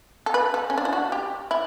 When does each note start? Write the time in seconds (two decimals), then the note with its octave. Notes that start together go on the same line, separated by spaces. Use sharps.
0.26 A4
0.34 B4
0.54 A4
0.70 C#4
0.78 D4
0.85 E4
0.93 F#4
1.12 G4
1.51 E4